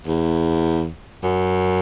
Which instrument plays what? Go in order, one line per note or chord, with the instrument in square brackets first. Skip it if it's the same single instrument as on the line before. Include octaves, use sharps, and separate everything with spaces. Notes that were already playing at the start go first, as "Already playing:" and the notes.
[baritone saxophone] E2
F#2